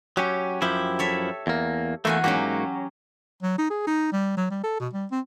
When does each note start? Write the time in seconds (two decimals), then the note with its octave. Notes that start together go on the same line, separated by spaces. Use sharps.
0.17 F#3 C#4 G4
0.62 F#2 F3 E4 G4
0.99 A4 C#5 E5
1.47 E2 A#3
2.05 E2 A3 A#3 F#4 G#5
2.24 G#2 F#3 A#3 C#4 F#4 G4
3.42 F#3
3.58 D#4
3.70 G#4
3.87 D#4
4.12 G3
4.37 F#3
4.51 G3
4.64 A4
4.79 B2
4.93 G3
5.11 C4